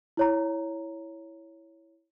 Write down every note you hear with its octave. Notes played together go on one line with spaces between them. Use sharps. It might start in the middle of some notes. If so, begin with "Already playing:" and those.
E4 C#5 A#5